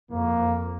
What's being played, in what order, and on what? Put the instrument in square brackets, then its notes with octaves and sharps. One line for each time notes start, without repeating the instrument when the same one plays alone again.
[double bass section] F2 [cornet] A#3